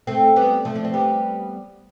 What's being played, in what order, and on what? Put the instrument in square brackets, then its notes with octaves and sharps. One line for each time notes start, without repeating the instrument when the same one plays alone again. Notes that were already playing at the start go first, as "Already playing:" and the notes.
[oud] A3 C4
G3 B3
F3 A3
D4
C4
G3 B3